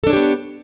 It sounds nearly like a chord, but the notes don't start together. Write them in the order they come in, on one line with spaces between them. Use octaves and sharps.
A4 D4 C#5 G4 B3